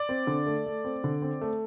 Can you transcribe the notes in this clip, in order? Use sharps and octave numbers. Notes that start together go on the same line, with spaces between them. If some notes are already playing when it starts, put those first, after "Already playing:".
Already playing: D5
C4
D3
A3
A3
C4
D3
C4
A3